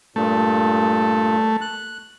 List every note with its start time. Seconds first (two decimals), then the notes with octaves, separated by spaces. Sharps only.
0.16 G2 A#2 A3
1.61 F#6